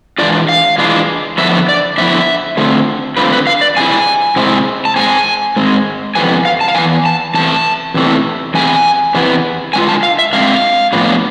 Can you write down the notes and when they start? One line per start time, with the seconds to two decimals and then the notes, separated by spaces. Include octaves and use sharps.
0.18 E3 G#3 D4 F4 D5
0.49 F5
0.78 E3 G#3 D4 F4
1.38 D3 F3 B3 E4 E5
1.69 D5
1.98 D3 F3 B3 E4 E5
2.57 D3 A3 C4 F4
3.17 D3 A3 C4 F4 B4
3.32 B4
3.47 F5
3.61 D5
3.77 C3 G#3 C4 E4 G#5
4.36 C3 G#3 C4 E4
4.85 A5
4.96 G#2 G#3 C4 G#5
5.56 G#2 G#3 C4
6.15 F2 C3 E3 B3 G#5
6.45 F5
6.61 A5
6.68 F5
6.75 F2 C3 E3 B3 G#5
7.06 A5
7.34 E2 C3 E3 A3 A5
7.94 E2 C3 E3 A3
8.54 E2 C3 E3 B3 E4 G#5
9.14 E2 C3 E3 B3 E4
9.73 D3 G#3 C4 F4 G#5
9.89 A5
10.03 F5
10.19 E5
10.33 D3 G#3 C4 F4 F5
10.92 A2 F3 B3 D4 F4